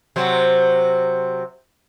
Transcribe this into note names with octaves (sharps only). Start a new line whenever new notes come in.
C3 F#3 C5